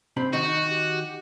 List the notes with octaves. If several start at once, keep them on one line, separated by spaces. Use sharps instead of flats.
C3 C4 B5
D#3 D#4 F#4 C#6
G4